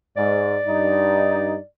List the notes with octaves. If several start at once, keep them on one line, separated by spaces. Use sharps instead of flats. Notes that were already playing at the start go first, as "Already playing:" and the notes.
G#2 D5
G2 D#4